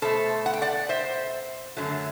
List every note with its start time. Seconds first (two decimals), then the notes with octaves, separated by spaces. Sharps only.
0.02 B2 A3 A4 C5
0.46 F#5
0.53 G5
0.62 D5 F#5
0.89 C5 E5
1.77 F#2 D3 F#3 A3